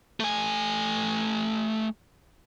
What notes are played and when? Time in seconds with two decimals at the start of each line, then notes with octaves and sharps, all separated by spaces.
0.20 A3 G#5